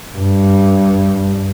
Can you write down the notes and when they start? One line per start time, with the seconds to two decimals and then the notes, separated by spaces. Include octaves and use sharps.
0.16 G2